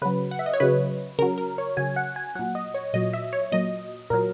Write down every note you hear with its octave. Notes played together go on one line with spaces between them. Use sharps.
C#3 F#3 B4
F#5
E5
D#5
C#5
C#3 F#3 B4
C#3 F#3 A#4
A#4
C#5
C#3 F#3 G#5
F#5
G#5
A#2 F#3 F#5
D#5
C#5
A#2 F#3 D#5
E5
C#5
A#2 F#3 D#5
A#2 F#3 A#4